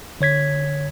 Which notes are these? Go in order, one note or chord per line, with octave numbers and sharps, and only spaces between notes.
D3 C#5 G#6 B6